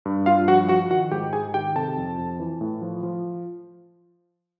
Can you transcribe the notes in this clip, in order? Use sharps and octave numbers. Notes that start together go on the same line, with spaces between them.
G2
G2 F4 F5
F3 F#4 F#5
F3 F#4 F#5
D#3 F#4 F#5
G#2 G4 G5
G#2 G#4 G#5
D#3 G4 G5
C3 A4 A5
F2
F2
E3
A2
F3
F3